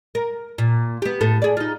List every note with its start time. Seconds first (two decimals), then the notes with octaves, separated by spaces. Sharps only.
0.15 A#4
0.58 A#2
1.02 B3 G4
1.21 A2 A4
1.42 G#4 D5
1.57 D#4 F4